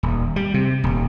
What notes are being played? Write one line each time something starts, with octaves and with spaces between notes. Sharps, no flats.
D#1
G3
C3
D#1